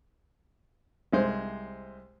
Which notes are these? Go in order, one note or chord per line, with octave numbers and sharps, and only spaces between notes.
C2 G#3 C5